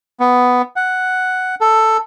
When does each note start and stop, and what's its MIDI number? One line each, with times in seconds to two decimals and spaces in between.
0.20 0.62 59
0.76 1.55 78
1.61 1.97 69